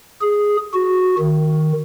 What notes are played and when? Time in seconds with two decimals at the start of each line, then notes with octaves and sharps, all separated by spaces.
0.21 G#4
0.74 F#4
1.19 D#3